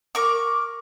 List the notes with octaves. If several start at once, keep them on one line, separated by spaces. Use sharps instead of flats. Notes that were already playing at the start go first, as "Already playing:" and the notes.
A#4 C#6 D6